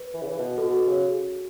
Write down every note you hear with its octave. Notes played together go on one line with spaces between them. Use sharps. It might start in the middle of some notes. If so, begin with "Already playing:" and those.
Already playing: B4
E3
C#3
E3
B2
A4
B2 F#4
C#3